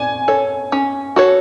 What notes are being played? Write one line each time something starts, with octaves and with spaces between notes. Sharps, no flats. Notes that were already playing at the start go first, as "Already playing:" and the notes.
Already playing: D4 G#5
A4 C#5
C#4
F#4 A4 C#5